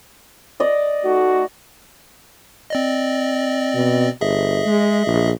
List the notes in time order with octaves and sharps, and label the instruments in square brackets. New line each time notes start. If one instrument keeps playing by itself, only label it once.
[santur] D5 D#5
[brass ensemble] A3 D#4 F#4
[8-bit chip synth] C4 D5 D#5
[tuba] B2
[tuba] G1 [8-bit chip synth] G#4 D#5 E5
[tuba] G#3
A#1